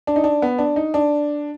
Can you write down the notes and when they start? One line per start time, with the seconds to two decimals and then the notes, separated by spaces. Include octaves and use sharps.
0.07 D4
0.16 D#4
0.24 D4
0.42 B3
0.58 D4
0.76 D#4
0.94 D4